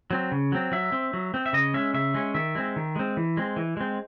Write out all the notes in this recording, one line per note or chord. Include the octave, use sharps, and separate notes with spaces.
F#3 C4
C#3
F#3 C4
F#3 E5
C4
F#3
C4
E5
C#3 D#5
G#3 C#4 E5
C#3 E5
G#3 C#4
D#3 E5
G#3 C4
D#3
G#3 C4
E3
G#3 C4
E3
G#3 C4